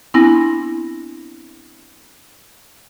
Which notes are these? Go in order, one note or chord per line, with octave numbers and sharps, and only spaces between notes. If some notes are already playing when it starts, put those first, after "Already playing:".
B3 C4 D4 E4 G#5 A#6